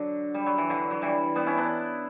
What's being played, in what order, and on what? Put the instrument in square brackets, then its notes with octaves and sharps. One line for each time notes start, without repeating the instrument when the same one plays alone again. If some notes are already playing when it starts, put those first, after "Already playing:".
Already playing: [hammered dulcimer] D3 F#3
G3
F#3
E3
D3 F#3
F#3
E3 G3
G3 B3
C#4 E4
B3 D4